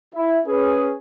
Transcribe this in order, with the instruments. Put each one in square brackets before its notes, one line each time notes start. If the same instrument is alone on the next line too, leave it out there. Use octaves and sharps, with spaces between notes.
[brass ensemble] E4
C#4 G#4 B4